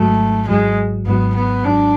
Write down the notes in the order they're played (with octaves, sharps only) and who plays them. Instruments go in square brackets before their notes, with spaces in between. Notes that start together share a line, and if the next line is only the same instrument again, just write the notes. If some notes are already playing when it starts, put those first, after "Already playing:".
Already playing: [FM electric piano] G#1 G#2 F#3 [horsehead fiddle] A3
[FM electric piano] G#1 G#2 F#3 [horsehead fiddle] G#3
[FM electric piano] G#1 G#2 F#3 [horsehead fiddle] B3
[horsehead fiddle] B3
[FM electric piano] G#1 G#2 F#3 [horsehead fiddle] D4